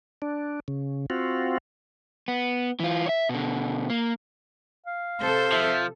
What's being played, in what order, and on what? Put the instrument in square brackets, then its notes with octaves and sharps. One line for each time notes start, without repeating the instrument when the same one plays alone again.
[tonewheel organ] D4
C#3
C4 F4 F#4
[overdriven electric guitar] B3
E3 F4
C#5 E5
B2 D3
A#3
[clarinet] F5
[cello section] C3 A4 [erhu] C5
[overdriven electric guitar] F3 [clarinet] E5